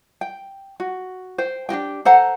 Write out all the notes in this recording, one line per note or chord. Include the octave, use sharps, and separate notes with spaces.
G5
F#4
C5 G5
D4 F#4 G4 G5
A4 C5 F#5 A#5